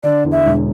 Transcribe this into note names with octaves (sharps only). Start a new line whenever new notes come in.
D3 D5
E2
E5
E1